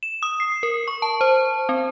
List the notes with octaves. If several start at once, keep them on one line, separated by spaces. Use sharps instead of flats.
E7
D#6
C7
A#4
C#6
A5
C5
C4